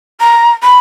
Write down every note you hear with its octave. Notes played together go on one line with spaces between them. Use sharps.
A#5
B5